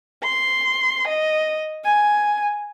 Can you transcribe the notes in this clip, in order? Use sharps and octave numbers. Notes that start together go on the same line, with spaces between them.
C6
D#5
G#5